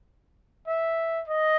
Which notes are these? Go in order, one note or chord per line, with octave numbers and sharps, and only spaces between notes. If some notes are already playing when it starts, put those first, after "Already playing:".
E5
D#5